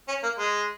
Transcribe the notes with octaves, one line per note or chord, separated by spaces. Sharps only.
C#4
A#3
G#3